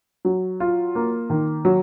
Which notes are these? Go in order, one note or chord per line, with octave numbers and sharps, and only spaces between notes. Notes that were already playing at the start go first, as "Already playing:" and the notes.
F#3
F4
A#3
D#3
F#3